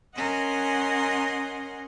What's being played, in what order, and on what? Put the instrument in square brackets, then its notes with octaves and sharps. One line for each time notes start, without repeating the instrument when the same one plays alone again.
[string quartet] C#4 A#4 D#5 F#5 G#5 C6